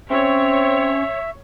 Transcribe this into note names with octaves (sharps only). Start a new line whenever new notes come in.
C4 C#4 C#5 E5